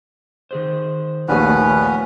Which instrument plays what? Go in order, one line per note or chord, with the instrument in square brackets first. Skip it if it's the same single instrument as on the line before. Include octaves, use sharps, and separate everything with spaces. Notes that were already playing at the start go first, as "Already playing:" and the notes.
[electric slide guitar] D#3 G#4 C5
[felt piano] A#1 D#2 [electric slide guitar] A3 G#5 [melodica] B3 C#4 B4